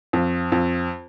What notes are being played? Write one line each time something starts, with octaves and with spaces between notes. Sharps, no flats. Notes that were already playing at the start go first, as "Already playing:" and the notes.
F2
F2